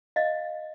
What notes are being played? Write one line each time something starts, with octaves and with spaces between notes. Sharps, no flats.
D#5 F5